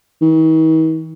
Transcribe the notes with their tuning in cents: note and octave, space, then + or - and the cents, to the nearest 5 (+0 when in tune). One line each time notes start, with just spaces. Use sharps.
D#3 +45